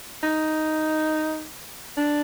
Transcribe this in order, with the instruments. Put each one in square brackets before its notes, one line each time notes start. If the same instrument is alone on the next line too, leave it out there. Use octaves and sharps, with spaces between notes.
[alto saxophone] D#4
D4